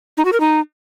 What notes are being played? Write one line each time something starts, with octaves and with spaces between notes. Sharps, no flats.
D#4
F#4
A#4
D#4